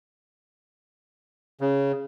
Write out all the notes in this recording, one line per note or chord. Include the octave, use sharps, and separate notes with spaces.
C#3